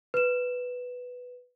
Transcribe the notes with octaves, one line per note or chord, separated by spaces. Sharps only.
B4 E7